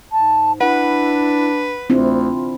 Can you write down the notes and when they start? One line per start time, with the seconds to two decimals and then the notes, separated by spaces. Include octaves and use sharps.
0.12 G#2 A5
0.61 D4 E4 B4 F#5
1.90 D2 C4 D4 E4 F4